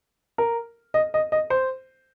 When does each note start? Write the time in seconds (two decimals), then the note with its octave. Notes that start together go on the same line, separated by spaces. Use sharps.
0.38 A#4
0.94 D#5
1.14 D#5
1.32 D#5
1.50 C5